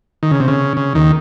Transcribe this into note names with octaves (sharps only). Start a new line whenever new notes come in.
D#3
C#3
C3
C#3
C#3
D#2 D#3